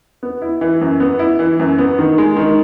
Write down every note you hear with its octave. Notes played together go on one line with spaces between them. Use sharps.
B3
E4
E3
F#2
B3
E4
E3
F#2
B3
D#3
G#3
D#3